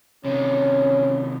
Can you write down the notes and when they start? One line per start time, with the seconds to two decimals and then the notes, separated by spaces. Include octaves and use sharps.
0.25 C3 D#3 C#4